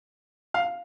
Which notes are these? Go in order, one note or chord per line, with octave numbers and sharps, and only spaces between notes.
F5